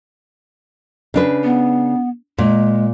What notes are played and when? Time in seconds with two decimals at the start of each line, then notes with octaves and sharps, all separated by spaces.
1.14 C#3 D4 B4
1.44 B3
2.38 A#2 G#3